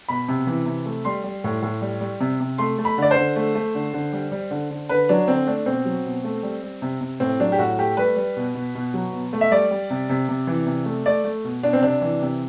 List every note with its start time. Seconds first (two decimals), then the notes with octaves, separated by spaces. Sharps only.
0.08 B2 B5
0.28 C3
0.47 E3
0.66 C3
0.86 A3
1.05 G3 C6
1.24 G3
1.44 A2
1.62 A2
1.82 G3
2.01 G3
2.20 C3
2.40 C3
2.58 A3 C6
2.78 A3
2.85 B5
2.98 D3 D5
3.11 C5
3.16 D3
3.36 A3
3.55 A3
3.75 D3
3.94 D3
4.13 G3
4.32 G3
4.51 D3
4.71 D3
4.89 D3 B4
5.09 F#3 D4
5.28 D3 C4
5.47 A3 D4
5.66 B2 C4
5.85 F#3
6.06 B2
6.24 A3
6.43 G3
6.63 G3
6.82 C3
7.01 C3
7.20 A2 C4
7.40 F#3 D4
7.52 G4
7.59 A2 F#4
7.78 A3 G4
7.97 G3 B4
8.16 G3
8.37 B2
8.55 B2
8.75 B2
8.94 F#3
9.13 B2
9.33 A3
9.41 E5
9.51 G3 D5
9.71 G3
9.90 C3
10.09 C3
10.29 C3
10.47 E3
10.66 C3
10.86 A3
11.06 A3 D5
11.24 A3
11.44 B2
11.63 B2 D4
11.73 C4
11.82 C3 D4
12.01 E3
12.21 C3